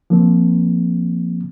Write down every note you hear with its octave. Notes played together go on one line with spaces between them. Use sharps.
F3 A#3 C4